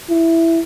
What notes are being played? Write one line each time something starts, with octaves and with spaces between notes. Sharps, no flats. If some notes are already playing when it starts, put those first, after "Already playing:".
E4